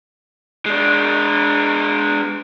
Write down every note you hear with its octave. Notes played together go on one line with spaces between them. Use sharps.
G#3 D4